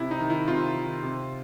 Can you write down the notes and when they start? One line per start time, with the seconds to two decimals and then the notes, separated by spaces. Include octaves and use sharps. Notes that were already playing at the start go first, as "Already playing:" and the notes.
Already playing: C3 E4
0.11 D#4
0.20 D#3
0.30 E4
0.48 C3 F4
0.76 D#3
1.03 C3